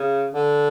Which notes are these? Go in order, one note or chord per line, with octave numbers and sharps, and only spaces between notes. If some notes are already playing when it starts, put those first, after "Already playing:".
Already playing: C#3
D3